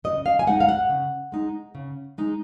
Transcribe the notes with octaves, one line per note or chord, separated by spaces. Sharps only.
C#3 D#5
F5
G#5
G#3 D#4 F#5
F5
F#5
C#3
G#3 D#4
C#3
G#3 D#4